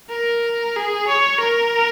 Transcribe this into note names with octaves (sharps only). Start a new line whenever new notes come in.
A#4
G#4
C#5
A#4